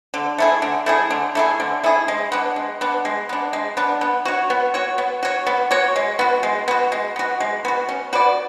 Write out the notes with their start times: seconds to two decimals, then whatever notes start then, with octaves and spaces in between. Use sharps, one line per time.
0.14 D3
0.38 A3 E4 G#4
0.62 D3
0.86 A3 E4 G#4
1.10 D3
1.35 A3 E4 G#4
1.60 D3
1.84 A3 E4 G#4
2.08 G#3
2.32 B3 D4
2.56 G#3
2.81 B3 D4
3.05 G#3
3.29 B3 D4
3.53 G#3
3.77 B3 D4
4.01 B3
4.25 F#4 C#5
4.50 B3
4.74 F#4 C#5
4.98 B3
5.23 F#4 C#5
5.46 B3
5.71 F#4 C#5
5.96 G#3
6.19 B3 F#4
6.43 G#3
6.68 B3 F#4
6.92 G#3
7.16 B3 F#4
7.40 G#3
7.65 B3 F#4
7.89 C#4
8.13 F#4 B4 D5